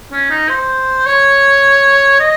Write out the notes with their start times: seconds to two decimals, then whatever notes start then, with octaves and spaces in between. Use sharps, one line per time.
0.12 C#4
0.30 D#4
0.49 C5
1.06 C#5
2.20 D#5